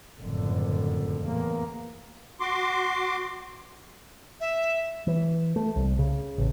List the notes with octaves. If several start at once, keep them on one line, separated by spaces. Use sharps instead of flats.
F#1 F2 A2 D3
E2 A2 A#3
F#4 C6 D6
E5
E3
A3
C2
C#3
A1